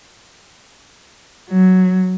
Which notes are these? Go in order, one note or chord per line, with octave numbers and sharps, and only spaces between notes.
F#3